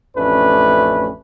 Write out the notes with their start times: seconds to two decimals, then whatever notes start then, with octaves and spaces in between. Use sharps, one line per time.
0.16 A1 F2 A3 C#4 D4 B4